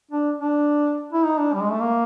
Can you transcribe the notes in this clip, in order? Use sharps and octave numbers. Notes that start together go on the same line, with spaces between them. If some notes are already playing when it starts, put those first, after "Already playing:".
D4
D4
E4
D#4
D4
G3
G#3
A3
A#3